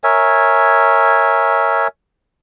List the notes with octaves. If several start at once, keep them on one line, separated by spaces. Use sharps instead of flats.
A#4 C#5 E5 G#5